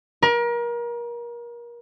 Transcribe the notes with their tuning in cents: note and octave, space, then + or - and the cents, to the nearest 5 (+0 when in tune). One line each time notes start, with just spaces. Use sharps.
A#4 +30